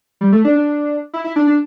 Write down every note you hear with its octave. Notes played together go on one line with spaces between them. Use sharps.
G3
A3
D4
D4
E4
E4
D4
D4